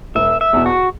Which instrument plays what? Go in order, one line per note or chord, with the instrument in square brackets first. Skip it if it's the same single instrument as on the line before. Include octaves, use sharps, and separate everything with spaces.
[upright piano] E1 [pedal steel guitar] E5
[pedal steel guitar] E5
[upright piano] E2 B2
[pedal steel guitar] F#4